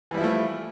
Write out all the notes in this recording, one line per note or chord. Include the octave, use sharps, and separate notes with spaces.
E3 F3 G3 A3 E4